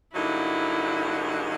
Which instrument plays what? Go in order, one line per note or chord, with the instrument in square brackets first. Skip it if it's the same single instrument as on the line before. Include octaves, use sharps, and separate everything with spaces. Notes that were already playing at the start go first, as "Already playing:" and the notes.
[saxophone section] G2 D3 F#3 A#3 D#4 [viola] E4